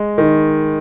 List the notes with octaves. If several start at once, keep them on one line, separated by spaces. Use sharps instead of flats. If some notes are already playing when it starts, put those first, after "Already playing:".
Already playing: G#3
D#3